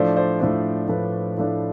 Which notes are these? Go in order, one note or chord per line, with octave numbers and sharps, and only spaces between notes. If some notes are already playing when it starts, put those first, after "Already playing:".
Already playing: A2 F3 A3 D4 C5 D5
C5 D5
A2 F3 A3 D4 C5
A2 F3 A3 D4 B4 C#5
A2 F3 A3 D4